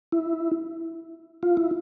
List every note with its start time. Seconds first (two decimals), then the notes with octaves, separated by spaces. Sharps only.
0.12 E4
1.43 F4
1.57 E4